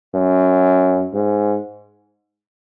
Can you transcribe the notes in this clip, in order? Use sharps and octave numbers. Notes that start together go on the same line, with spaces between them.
F#2
G#2